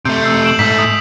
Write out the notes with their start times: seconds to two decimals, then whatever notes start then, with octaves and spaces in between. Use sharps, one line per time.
0.05 C3 A3 G6
0.23 E6 C7
0.44 D7 E7 F#7
0.59 G#2 A3 B6
0.78 D#6